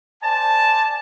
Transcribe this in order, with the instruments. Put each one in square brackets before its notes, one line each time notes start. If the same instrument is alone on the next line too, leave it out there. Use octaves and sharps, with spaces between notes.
[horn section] C5 D5 G#5 A5